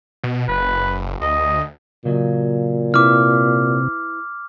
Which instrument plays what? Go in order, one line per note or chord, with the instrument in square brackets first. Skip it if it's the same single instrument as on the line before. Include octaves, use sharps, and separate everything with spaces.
[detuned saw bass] B2
[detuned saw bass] F#1 [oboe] B4
[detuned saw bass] D2 [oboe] D#5
[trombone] A#2 [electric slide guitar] C#3 F#3 D#5
[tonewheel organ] C3 [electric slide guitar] E4 B4 [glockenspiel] D6 F6